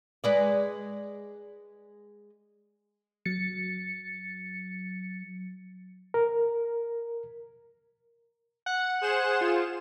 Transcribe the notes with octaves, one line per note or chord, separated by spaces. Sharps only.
G#3 B4 D5
F#3 A6 C#7
A#4
F#5
G#4 C5 E7
F4